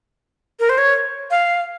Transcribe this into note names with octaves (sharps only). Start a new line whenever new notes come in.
A#4
C5
C#5
F5